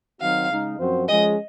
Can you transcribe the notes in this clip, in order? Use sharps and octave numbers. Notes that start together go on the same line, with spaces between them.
D#3 F#3 C4 D#4 F#4 F5
C#3 G#3 D#4
F#2 F3 C4 F#4 C5
F3 G#3 C#4 G#4 D#5